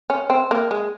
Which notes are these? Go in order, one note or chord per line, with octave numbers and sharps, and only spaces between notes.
C#4
C4
A#3
G#3